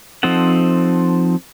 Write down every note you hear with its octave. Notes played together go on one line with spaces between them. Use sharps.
F3 C4 D#4 A4 F#5